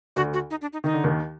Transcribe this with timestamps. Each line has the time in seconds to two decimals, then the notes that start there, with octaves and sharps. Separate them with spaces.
0.16 D2 D3 F#4
0.34 F#4
0.50 D#4
0.61 D4
0.73 D#4
0.84 D#3 D#4
0.94 D3
1.04 D#2 D#3